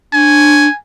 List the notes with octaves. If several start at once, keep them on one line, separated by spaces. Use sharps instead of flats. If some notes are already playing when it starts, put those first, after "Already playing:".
D4 G#5